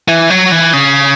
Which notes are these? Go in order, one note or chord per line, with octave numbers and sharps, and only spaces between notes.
E3
F#3
E3
C#3